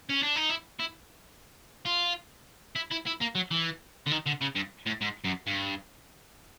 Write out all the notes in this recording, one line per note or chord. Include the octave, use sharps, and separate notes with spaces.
C#4
D4
D#4
E4
E4
F4
E4
E4
E4
A#3
F#3
E3
D3
D#3
D3
C#3
G2
A2
G#2
F#2
G2